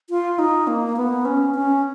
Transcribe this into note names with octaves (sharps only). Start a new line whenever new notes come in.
F4
D#4
A#3
B3
C#4
C#4